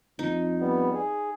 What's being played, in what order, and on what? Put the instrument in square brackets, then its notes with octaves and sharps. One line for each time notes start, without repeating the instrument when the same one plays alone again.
[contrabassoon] F2 [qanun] D#4
[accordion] G3 B3
G#4